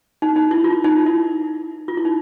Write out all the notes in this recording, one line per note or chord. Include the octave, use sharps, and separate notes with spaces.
D#4
D#4
E4
F4
D#4
E4
F4
E4
D#4